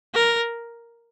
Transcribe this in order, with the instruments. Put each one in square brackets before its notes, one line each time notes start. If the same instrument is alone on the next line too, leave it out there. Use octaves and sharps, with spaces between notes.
[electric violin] A#4